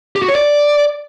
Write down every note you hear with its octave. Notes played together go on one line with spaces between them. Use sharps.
G4
F#4
C#5
D5